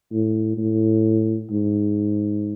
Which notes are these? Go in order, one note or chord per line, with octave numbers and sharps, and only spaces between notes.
A2
A2
G#2